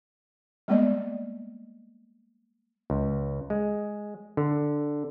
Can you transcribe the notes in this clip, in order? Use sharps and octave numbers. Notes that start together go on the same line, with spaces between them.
G3 G#3 A#3 B3 D5 D#5
C#2
G#3
D3